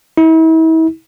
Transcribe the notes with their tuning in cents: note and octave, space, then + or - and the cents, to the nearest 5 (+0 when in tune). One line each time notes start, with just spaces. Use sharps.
E4 -40